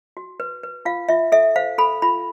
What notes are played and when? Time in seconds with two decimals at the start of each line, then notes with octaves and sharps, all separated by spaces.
0.17 F#4
0.40 B4
0.63 B4
0.85 F4 F5
1.09 F4 E5
1.32 A4 E5
1.56 C5 F5
1.78 A4 B5
2.02 F4 B5